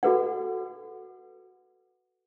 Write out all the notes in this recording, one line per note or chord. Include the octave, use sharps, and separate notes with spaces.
F#4 A4 B4 F#5